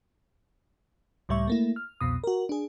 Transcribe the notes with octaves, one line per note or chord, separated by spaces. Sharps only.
C#2 A2 G3 E5 C#6
A3 A#3 E4
F6
C2 F2 B2 D#6
F#4 A#4
D4 G#4